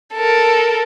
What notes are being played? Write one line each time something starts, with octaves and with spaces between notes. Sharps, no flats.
A4 A#4